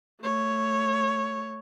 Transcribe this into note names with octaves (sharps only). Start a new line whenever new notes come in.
A3 C#5